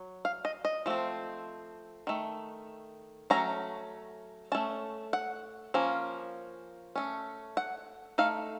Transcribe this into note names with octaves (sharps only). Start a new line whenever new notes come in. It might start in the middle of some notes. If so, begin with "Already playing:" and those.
Already playing: F#3
F5
D#5
D#5
F3 A3 C4
D#3 A3
F#3 A3 C#4 A#5
A3 C#4 A5
F#5
F3 A#3 C#4
A3 C#4
F#5
A3 D#4 F5